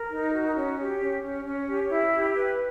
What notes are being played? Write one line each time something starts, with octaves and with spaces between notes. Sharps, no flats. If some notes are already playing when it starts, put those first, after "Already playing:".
Already playing: A#4
D#4
F#4
C#4
G4
C#4
C#4
C#4
G4
E4
G4
B4